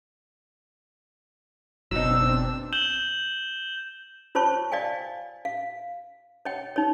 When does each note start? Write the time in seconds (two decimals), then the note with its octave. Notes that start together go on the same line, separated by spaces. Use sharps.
1.91 F#1 B2 F#3 C4 D4 D#4 E6
2.73 G6 E7 F#7 G7
4.35 F4 C5 C#5 A5 C#6
4.72 D5 D#5 F5 G5 G#5
5.45 F5
6.45 C#5 D#5 F#5 G5
6.76 D#4 C#5